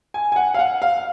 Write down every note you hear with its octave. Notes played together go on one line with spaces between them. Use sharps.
G#5
G#5
F#5
F5
F#5
F5